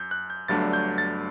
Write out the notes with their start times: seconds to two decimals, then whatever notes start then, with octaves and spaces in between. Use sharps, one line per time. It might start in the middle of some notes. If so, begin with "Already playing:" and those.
Already playing: F#2 G6
0.11 F#6
0.30 G6
0.48 G1 G2 F#3 A3 D4 A6
0.73 G6
0.98 A6